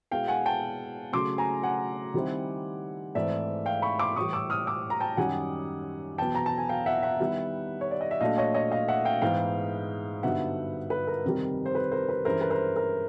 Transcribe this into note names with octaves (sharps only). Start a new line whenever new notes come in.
B2 G#3 B3 E4 F5 G5
F#5 G#5
G5 A5
C#3 F#3 A3 C6 D6
G#5 A#5
F#5 G#5
D#3 G3 C4 E4
G#2 E3 A3 C4 D5 E5
F5 G5
B5 C#6
C6 D6
A2 E3 G3 C#6 D#6
D6 E6
D#6 F6
D6 E6
A#5
G5 A5
F#2 D#3 G3 F#5 G#5
E2 B2 F#3 B3 G5 A5
A#5
A5
G#5
F5 G5
E5 F#5
E5 F#5
D#3 G3 B3 E4
C#5
D5
D#5
E5
A#2 F#3 A3 D4 D#5 F5
C#5 D#5
C#5 D#5
D#5 F5
E5 F#5
F5 G5
G#2 E3 G#3 B3 D#4 F5 G5
G2 D3 F#3 B3 D#4 E5 F#5
B4
A#4
F2 C3 D#3 G3
C5
B4
A#4 C5
B4
G2 E3 G#3 C#4 E4 A#4 C5
B4
A#4 C5
A#4